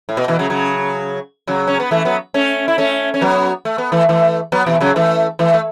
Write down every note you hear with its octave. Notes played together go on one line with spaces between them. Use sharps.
A2
B2
B2 E3
C#3 F#3
C#3 F#3
C#3 F#3
C#4
B3
E3 A3
F#3 B3
A3 C#4
E4
A3 C#4
C#4
F#3 B3
A3
B3
E3 A3
E3 A3
F#3 B3
B2 E3
C#3 F#3
E3 A3
E3 A3
A3